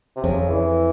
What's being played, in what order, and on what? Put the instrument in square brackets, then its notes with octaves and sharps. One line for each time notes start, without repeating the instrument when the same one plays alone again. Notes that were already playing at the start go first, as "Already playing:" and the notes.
[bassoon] C3
[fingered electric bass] F2 [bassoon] C#3
[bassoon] E3